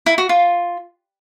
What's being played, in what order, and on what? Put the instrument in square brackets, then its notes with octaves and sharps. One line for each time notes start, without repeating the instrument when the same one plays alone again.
[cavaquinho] E4
F#4
F4